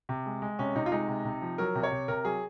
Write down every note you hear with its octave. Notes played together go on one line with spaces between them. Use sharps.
C3
G#3
G#3
C3 C#4
C3 D#4
F4
G#3 D#4
C3
C3
F3
F#3 A#4
C3
C#5
C3
C3 A#4
F#3 G#4